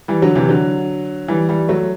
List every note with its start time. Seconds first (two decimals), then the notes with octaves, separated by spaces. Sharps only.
0.08 E3 G3
0.22 D3 F#3
0.35 C3 E3
0.49 D3 F#3
1.28 E3 G3
1.49 E3 G3
1.69 F#3 A3